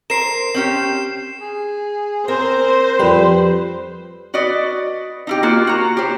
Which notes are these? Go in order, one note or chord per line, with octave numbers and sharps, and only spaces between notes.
A#4 C5 C7 E7
C4 C#4 G4
G#4
C4 A#4 C5
F2 G3 B4
F#4 B4 D5 D#5
D#4 E4 G4
A#3 F4 F#4
F#4 A#5
G4 C5